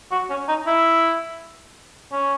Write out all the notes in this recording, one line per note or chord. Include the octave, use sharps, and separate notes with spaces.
F#4
C#4
D#4
E4
C#4